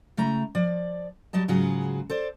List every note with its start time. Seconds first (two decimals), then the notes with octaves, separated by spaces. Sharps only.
0.17 C#3 A3 E4 A#5
0.55 F3 D5
1.33 F#3 G3 D#5 A5
1.48 G#2 C#3 F#3 F4 F#4 G#4
2.10 A4 C5 D5